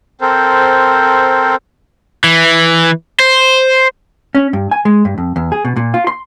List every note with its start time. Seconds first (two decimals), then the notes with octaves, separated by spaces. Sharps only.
0.21 C4 A4 A#4 C5
2.24 E3
3.19 C5
4.35 C#4
4.53 G2
4.71 G#5
4.85 G#3
5.05 G2
5.18 F2
5.36 E2
5.52 G#4
5.65 B2
5.76 A#2
5.94 F4
6.07 C6